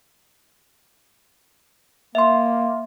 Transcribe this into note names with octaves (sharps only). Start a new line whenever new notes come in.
A#3 E5 C6